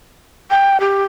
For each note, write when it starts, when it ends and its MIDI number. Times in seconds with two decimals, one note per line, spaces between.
0.50 0.80 79
0.80 1.04 67